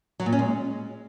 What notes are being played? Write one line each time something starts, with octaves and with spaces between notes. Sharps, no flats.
F#3
A#2
C#4
G#3